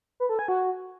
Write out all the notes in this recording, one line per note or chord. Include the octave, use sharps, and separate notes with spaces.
B4
A4
G#5
F#4